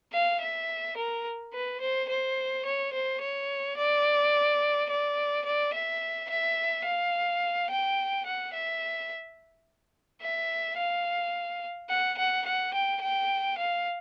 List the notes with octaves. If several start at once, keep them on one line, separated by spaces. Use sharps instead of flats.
F5
E5
A#4
B4
C5
C5
C#5
C5
C#5
D5
D5
D5
E5
E5
F5
G5
F#5
E5
E5
F5
F#5
F#5
F#5
G5
G5
F5